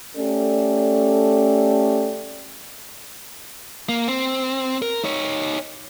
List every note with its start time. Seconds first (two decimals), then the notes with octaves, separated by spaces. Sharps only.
0.16 A3 C#4 G4 A4 D5
3.89 A#3
4.08 C4
4.82 A#4
5.04 D#4 C#5